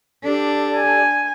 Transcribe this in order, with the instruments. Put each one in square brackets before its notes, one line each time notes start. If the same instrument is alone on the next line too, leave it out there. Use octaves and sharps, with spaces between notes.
[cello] D4 [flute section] G4 A4 D5
[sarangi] G#5